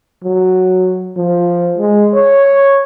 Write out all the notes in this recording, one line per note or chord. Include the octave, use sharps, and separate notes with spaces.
F#3
F3
G#3
C#5